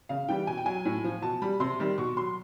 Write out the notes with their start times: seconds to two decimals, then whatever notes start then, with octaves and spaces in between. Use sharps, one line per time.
0.09 C#3 F5
0.29 E3 G3 G5
0.47 B2 G#5
0.57 G5
0.66 F#3 G#5
0.85 A2
1.04 F3
1.22 B2 A5
1.42 G3 B5
1.60 C3 C6
1.80 D#3 G3
1.98 B2 C#6
2.17 F#3 C6